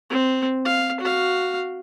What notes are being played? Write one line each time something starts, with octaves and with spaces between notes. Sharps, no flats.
C4
F5
F#4 F5